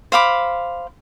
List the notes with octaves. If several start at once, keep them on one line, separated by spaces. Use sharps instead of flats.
C5 F5 B5 D6